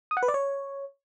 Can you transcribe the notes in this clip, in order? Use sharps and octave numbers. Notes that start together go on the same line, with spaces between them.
D#6
F#5
B4
D5
C#5